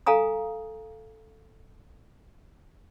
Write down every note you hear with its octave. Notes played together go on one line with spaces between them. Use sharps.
A4 F5 G#5 A#5 D#6